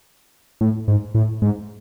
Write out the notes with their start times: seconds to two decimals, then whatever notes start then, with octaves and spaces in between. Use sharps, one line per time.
0.61 A2
0.88 G#2
1.14 A2
1.42 G#2